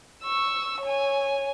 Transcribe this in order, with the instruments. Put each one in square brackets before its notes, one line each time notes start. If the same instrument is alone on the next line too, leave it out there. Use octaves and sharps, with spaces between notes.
[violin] C#6 E6
C#5 G#5